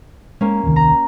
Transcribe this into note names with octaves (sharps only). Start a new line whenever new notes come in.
G#3 A#3 C#4
D#1 C2 D#3
A#5